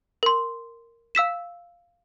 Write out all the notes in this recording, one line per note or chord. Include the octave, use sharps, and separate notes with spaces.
A#4 C6
F5 E6 B6 E7